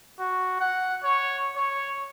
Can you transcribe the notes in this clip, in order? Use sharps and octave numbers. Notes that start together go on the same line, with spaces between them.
F#4
F#5
C#5
C#5